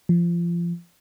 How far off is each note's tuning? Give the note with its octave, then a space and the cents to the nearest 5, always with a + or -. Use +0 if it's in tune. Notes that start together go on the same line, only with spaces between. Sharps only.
F3 -25